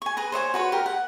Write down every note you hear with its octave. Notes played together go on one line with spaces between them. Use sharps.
G#5 C#6
G#4 B4 A#5
C5 C#5 D#5 G#5
F#4 B4 C#5
G4 A#4
F#5